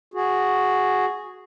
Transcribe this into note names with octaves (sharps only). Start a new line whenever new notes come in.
F#4 G#4